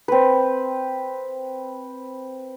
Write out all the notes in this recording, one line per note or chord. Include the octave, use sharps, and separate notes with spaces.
C4 B4